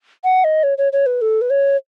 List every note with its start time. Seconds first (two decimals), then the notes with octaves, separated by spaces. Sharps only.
0.24 F#5
0.44 D#5
0.63 C#5
0.78 C#5
0.93 C#5
1.06 B4
1.22 A4
1.41 B4
1.50 C#5